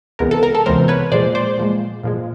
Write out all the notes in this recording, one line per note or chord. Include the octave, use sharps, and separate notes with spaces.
C#2 C3 E3 G#3 B3 A#4
A4
A#4
A4
C#2 C3 E3 G#3 B3 A#4 C5
B4 C#5
A#2 F3 G#3 C5 D5
C5 D5
A#2 F3 G#3
A#2 F3 G#3